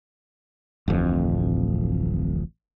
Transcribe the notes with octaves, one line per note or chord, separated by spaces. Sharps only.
D1 A1 F2